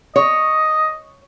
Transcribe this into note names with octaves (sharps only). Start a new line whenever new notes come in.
C#5 D#5